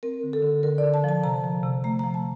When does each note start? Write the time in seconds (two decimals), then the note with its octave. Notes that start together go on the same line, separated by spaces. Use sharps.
0.03 C4 A#4
0.23 D3
0.33 A4
0.43 D3
0.63 D3 A#4
0.78 D5
0.84 D3
0.94 A5
1.04 F3 A5
1.23 C3 A#5
1.44 F3
1.63 C3
1.84 A3 A#5
1.99 F3 A#5
2.14 A5